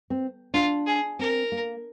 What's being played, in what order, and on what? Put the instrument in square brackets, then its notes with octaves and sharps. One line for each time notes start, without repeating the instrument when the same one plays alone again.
[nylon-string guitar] C4
[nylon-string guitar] D4 [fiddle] F4
[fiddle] G#4
[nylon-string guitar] C4 [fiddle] A#4
[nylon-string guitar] A#3